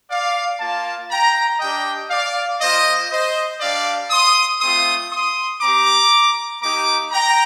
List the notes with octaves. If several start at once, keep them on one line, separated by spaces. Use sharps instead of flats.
D5 F5
A#3 F4 F5 A5
G5 A#5
G3 D4 G4 D#5 G5
D5 F5
A#3 F4 C5 D#5
C5 D#5
G3 D4 G4 D5 F5
C6 D#6
A3 C4 F4 C6 D#6
C6 D#6
C4 G4 A#5 D6
A#3 D#4 G4 A#5 D6
G5 A#5